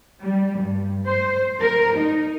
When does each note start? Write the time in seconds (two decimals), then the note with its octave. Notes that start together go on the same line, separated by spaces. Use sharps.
0.22 G3
0.60 G2
1.07 C5
1.61 A#4
1.97 D#4